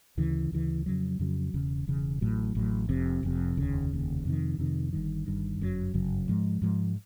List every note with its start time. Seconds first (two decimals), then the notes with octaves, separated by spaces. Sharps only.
0.17 D2 C#3 E3
0.52 D2 C#3 E3
0.86 F2 C#3 F#3
1.19 F2 C#3 F#3
1.54 E1 E2 C#3
1.87 E1 E2 C#3
2.21 A1 A2 F#3
2.55 A1 A2 F#3
2.89 F1 F2 C3
3.23 F1 F2 C3
3.57 F1 D#2 C#3
3.91 F1 D#2 C#3
4.25 F2 C3 D#3
4.58 F2 C3 D#3
4.93 G1 G2 D#3
5.26 G1 G2 D#3
5.60 G1 F#2 C#3 F#3
5.94 G1 F#2 C#3 F#3
6.28 G#2 F3 G#3
6.62 G#2 F3 G#3